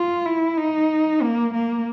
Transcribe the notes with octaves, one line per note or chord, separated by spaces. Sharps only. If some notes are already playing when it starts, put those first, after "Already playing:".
Already playing: F4
E4
D#4
A#3
A#3